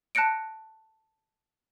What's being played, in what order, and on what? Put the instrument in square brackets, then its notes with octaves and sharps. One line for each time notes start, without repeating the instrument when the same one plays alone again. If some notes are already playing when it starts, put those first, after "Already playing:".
[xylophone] A5 F#6 A#6 C#7 D7